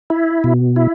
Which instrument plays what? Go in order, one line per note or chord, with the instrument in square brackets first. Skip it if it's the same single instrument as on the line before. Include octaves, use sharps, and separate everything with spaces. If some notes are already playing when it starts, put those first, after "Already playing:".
[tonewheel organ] E4
B2
E4